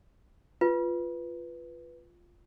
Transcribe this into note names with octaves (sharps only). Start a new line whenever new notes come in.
F4 B4